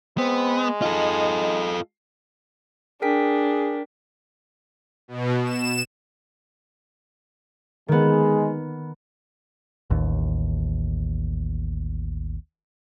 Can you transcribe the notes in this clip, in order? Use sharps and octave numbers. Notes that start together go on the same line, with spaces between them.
G#3 B3 C4
D#4 F4 A4
D4 G#4 A#4 G5 B6
B2
E7
D#3 G#3 B3
A1 D#2